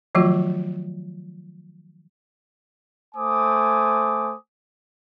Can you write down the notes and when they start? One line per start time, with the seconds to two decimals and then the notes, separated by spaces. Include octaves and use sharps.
0.15 D#3 F3 F#3 A3 F4 F#4
3.15 A3 C5 G#5 D6 D#6